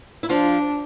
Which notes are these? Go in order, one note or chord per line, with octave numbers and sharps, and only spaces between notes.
E4
F3 D4 F4